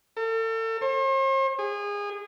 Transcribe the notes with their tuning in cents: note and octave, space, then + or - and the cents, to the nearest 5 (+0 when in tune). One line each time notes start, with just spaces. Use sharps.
A4 +40
C5 +45
G#4 -25